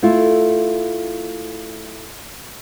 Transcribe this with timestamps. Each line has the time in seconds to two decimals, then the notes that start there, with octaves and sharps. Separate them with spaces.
0.03 A3 E4 F4